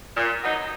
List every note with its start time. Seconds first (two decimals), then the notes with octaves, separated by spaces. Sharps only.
0.17 A#2
0.43 F#3 B3 D#4